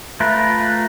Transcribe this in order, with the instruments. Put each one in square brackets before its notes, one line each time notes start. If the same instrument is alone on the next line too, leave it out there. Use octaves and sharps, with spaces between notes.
[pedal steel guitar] A3 F4 A#4 B4